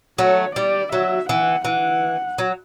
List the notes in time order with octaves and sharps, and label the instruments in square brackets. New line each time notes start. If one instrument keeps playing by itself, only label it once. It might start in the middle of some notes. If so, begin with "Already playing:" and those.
[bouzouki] F#3 A3 [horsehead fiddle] C#5
[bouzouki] G3 [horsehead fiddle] D5
[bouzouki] F#3 [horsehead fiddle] E5
[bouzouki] E3 [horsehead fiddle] F#5
[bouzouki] E3 [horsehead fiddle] F#5
[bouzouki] F#3